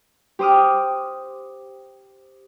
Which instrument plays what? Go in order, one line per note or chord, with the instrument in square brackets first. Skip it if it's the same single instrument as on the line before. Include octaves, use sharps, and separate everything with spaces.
[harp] G4 C5 D6 D#6 F6